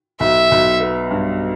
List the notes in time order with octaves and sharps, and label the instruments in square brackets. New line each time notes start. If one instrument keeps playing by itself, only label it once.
[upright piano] B1 [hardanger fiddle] E5
[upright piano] B1
B3
G2